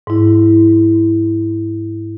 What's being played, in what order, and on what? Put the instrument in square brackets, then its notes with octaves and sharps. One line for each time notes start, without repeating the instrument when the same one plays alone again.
[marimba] G#2 E4